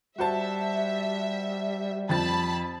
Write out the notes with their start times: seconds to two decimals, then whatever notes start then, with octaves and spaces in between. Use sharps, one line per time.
0.18 G3 F#4 C5 E5 A5
2.09 F2 C4 A5 B5 A6